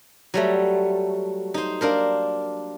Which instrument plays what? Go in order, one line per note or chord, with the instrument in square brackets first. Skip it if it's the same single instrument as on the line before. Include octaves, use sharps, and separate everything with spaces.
[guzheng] F#3 G3 A3
D#4 C5
A#3 D4 A#4 C5